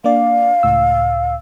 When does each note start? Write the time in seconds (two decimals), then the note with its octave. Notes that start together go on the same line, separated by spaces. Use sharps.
0.04 A#3 D4 D5 F5
0.63 C#2 A2 E6